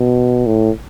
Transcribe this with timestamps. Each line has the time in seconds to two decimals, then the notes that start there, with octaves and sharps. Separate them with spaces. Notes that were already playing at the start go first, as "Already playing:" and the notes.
Already playing: B2
0.46 A2